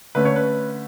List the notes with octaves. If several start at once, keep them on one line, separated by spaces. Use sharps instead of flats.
D3 A3 C#4 B4
C#5
B4